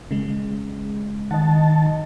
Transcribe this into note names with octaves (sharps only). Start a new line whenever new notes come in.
C#3 G#3
D#3 D#5 F#5 A5